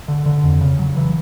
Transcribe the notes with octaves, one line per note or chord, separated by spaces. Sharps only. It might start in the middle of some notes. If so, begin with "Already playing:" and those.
D3
D3
F2
C#3
F#3
E3